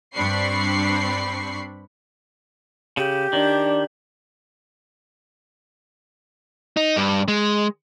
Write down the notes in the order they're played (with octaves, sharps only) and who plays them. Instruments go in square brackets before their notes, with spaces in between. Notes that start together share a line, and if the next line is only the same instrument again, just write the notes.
[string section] G2 C4 D4 B5 C#6 C7
[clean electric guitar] C#3 [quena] G4
[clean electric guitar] D#3 [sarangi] D4
[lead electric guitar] D#4
G2
G#3